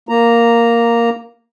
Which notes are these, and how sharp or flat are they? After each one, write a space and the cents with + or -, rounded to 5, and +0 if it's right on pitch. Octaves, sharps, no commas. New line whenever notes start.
A#3 +0 A#5 -5